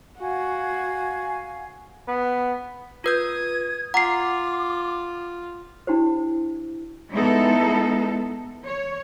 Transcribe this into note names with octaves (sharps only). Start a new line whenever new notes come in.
F#4 F5 F#5 G#5
B3
F4 B4 D#6 G6 G#6
F4 F#5 A#5 D6 C7
D4 E4 F#4 G4 C5
G#3 B3 D#4 E4 A4
C#5